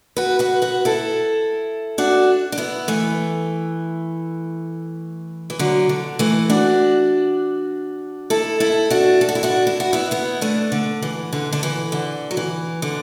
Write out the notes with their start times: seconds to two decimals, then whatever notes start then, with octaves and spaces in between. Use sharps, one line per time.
0.16 F#4 B4
0.39 F#4 B4
0.62 F#4 B4
0.85 E4 A4
1.98 D4 F#4
2.52 D4
2.58 B3 E4
2.88 E3 A3
5.50 E3
5.59 D3 F#3
5.89 D3
6.19 E3 A3
6.50 D4 F#4
8.30 E4 A4
8.60 E4 A4
8.90 D4 F#4
9.21 A4
9.29 F#4
9.35 E4
9.43 D4 F#4
9.67 E4
9.80 F#4
9.93 B3 E4
10.11 B3 E4
10.41 A3 D4
10.72 D3
11.02 E3
11.33 D3
11.53 D3
11.63 E3
11.92 D3
12.31 F#3
12.37 E3
12.82 D3